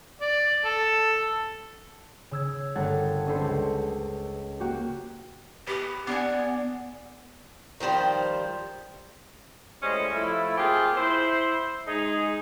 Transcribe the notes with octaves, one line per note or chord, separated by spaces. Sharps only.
D5
A4
C#3 E6 G#6
G1 A3 A#4 F#5 G#6 A6
C#4 D4 A4 B4 C5
C#2
A#3 F#4 G4
B3 G4
B3 D4 G#5
D#3 F3 G3 C5
A2 G3 G#3 C#4 C5 D#5
F3 A3 E4
A#3 C4 F4 G4 G#4
E4 C5
G#3 D#4 G#4